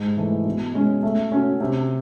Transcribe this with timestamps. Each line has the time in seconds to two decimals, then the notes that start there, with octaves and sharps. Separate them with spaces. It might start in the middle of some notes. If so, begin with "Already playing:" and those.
Already playing: G#2
0.17 E3 A3
0.46 B2
0.74 G#3 C#4
1.02 A3
1.32 C#4 F#4
1.60 C3